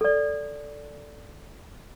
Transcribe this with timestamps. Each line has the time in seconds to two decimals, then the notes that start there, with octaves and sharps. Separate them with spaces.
0.01 A4 D5